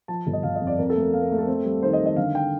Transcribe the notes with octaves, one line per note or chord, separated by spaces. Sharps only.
F3 A5
G1
D#5
G1 F5
D#5
F2
D5
F2 A#4
A4
A3
A#4
A3 F5
A#4
A3
A4
C4
G3
D#3 C5
D#5
D#3
D#5
D3 F5
G5